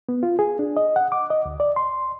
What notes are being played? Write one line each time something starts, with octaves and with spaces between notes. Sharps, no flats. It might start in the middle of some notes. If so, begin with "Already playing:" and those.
B3
F4
G#4
D4
D#5
F#5
D6
D#5
D2
D5
C6